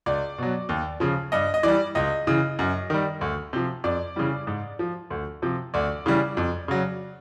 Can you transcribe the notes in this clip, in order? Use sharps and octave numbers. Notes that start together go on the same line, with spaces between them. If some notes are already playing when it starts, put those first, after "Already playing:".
C#2 D5
B2 F#3
D#2
C#3 F3
G2 D#5
D#5
E3 G3 D5
C#2 D#5
C#3 E3
F#2
D#3 G3
D2
C3 F3
F2 D5
C#3 E3 G3
G#2
F3
D2
C3 F3
D2 D5
C#3 E3 G3
F2
C#3 F#3